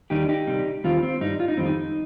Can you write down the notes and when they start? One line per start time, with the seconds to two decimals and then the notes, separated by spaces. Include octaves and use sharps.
0.10 D#2 D#3 G3 D#4 G4
0.29 D#4 G4
0.47 C2 C3 G3
0.84 D#2 D#3 G3 C4 F4
1.03 C4
1.21 G2 G3 D#4
1.40 F4
1.48 D#4
1.57 F2 D#3 G3 C4
1.66 D#4